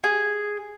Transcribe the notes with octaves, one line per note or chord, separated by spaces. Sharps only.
G#4